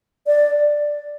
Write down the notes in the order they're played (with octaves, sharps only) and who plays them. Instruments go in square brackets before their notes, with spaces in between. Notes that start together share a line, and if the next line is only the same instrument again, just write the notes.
[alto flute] D5